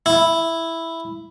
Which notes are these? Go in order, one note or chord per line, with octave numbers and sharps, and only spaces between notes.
E4